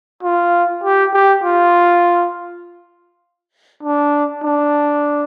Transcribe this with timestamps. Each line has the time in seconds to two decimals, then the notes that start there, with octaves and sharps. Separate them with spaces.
0.23 F4
0.84 G4
1.14 G4
1.44 F4
3.83 D4
4.44 D4